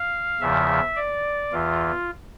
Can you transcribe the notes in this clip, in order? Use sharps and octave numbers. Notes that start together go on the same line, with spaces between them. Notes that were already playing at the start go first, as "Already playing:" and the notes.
Already playing: F5
E2 C#3 F3 E5
D5
E2 E3 F4